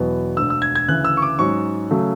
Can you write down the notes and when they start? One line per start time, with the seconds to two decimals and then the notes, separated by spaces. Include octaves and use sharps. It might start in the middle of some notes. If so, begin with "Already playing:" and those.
Already playing: E1 E2 B2 F#3 B3
0.37 E1 D2 D3 E6
0.50 E6
0.62 G#6
0.75 G#6
0.88 D2 C#3 E3 F#6
1.04 E6
1.17 C#6
1.22 D6
1.39 G#2 F#3 C#4 C#6
1.91 C#3 F#3 A3